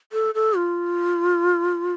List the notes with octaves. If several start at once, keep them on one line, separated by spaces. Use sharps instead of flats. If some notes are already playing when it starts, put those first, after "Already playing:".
A4
A4
F4